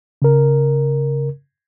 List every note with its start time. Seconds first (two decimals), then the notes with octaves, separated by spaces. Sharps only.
0.22 C#3 A#4